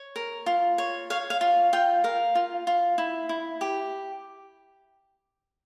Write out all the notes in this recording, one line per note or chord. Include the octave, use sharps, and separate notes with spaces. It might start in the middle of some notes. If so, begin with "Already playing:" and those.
Already playing: C#5
A#4
F4
C#5
C#5 F5
F5
F4
F4 G5
A#4 F5
F4
F4
E4
E4
G4